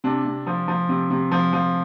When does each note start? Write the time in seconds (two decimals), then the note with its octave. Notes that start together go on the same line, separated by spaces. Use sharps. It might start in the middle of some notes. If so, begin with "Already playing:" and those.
0.04 C3 D4
0.25 C3
0.47 F3
0.68 F3
0.89 C3
1.10 C3
1.31 F3
1.53 F3